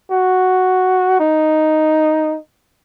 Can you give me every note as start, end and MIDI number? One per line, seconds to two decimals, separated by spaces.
0.11 1.19 66
1.20 2.38 63